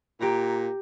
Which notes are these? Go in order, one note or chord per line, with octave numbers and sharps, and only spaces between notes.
A#2 G4 A#5